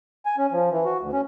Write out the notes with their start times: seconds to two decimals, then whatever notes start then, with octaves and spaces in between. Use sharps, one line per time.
0.26 G#5
0.38 C#4
0.52 F3
0.71 E3
0.85 F#4
1.00 D2
1.13 C#4